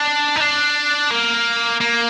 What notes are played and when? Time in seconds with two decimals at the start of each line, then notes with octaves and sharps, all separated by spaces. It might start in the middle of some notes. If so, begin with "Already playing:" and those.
Already playing: D4
0.36 D#4
0.40 D4
1.11 A#3
1.80 A#3